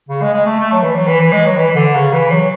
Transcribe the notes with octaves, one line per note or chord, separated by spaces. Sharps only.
C#3
G#3
G#3
A3
A3
F#3
E3
F#3
E3
E3
G#3
F#3
E3
E3
D3
C#3
E3
F#3